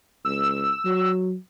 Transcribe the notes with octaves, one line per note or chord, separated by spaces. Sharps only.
C#2 E6
F#3